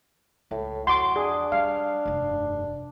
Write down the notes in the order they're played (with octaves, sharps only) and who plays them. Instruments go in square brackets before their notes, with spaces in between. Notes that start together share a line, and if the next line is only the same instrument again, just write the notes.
[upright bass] C#2 [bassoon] A2
[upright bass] F2 [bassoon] F#4 [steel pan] C6 D6
[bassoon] D4 [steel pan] G#4
[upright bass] G3 [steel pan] F5
[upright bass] F1 G2